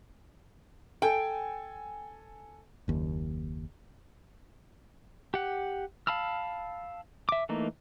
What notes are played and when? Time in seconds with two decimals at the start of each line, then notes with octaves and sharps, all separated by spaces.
1.02 A4 G5 G#5
2.88 F#1 D#2
5.34 G4 F#5
6.07 F5 A5 B5 E6 F6
7.29 E5 D6
7.49 E3 A3 A#3 D#4